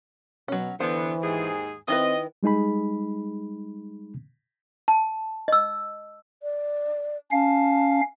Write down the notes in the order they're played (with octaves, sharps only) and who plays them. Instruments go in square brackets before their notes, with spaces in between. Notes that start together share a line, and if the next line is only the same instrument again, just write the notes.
[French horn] B2 [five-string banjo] F#3 C#4
[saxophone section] D3 B3 [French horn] E3 [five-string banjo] C5
[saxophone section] D#2 G#2 G#4
[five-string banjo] D#3 E4 B4 [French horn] C4 [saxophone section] D#5
[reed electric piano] G3 G#3 D#4 G#4 B5
[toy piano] A5
D#5 E6
[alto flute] D5
[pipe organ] C#4 F5 [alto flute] A5